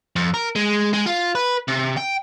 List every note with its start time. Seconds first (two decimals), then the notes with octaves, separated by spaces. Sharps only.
0.16 F2
0.34 A#4
0.56 G#3
0.94 G#3
1.06 F4
1.35 B4
1.68 C3
1.97 G5